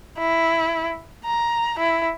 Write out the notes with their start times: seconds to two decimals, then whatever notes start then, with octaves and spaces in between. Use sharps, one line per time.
0.19 E4
1.25 A#5
1.79 E4